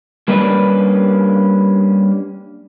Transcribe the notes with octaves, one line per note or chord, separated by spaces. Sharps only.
G3 A#3 C#4 D4 B4 D5